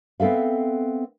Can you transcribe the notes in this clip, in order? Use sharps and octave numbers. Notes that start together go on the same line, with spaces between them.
B3 C4 A4 E5 F5